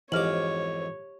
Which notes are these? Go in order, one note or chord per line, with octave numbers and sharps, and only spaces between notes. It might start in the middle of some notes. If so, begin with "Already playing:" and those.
F2 G#2 E3 G4 C#5 D6 F6 F#7